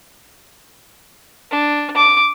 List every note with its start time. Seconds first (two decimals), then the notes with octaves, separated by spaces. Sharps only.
1.51 D4
1.96 D6